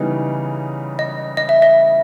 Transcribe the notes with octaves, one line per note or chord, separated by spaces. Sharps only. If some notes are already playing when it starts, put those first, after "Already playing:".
Already playing: C#3 E3 G3 B3 D#4
D#5
D#5
E5
D#5